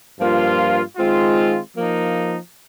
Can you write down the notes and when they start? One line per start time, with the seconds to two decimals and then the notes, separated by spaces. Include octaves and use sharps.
0.18 G2 F3 A#3 F4
0.96 D#3 G#3 C4 F4
1.75 F3 A#3 D#4